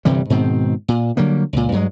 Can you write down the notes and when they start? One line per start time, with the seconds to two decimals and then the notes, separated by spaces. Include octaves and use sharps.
0.05 G1 C3 E3 G3
0.30 G#2 B2 D#3 C4
0.88 A#2
1.17 D3 F#3 G3 A#3
1.53 C#2 A#2
1.72 G2 F#3 G#3